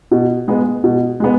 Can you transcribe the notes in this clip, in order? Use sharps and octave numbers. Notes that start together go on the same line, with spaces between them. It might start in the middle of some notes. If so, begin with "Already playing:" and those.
B2
G#3 B3
B2
G#3 B3